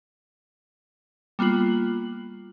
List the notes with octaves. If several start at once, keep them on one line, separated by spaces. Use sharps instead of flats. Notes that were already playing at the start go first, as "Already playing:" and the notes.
G3 A#3 B3 F4 F#7